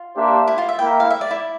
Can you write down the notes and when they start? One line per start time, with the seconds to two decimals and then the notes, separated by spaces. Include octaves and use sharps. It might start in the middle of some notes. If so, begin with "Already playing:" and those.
Already playing: F4
0.16 A#3 D4 G4 C5 E5
0.47 E4
0.58 F4
0.69 E5
0.79 A#3 E4 A#4 G5
1.00 F5
1.10 E5
1.21 D5
1.31 E4